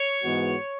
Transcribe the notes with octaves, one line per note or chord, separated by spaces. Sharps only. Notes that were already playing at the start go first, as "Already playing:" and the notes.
Already playing: C#5
G#2 E3 G#3 B3 F#4